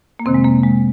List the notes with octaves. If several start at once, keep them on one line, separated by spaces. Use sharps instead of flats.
A#3
F2 C3 D#3 C4
G#3
A#3
G#3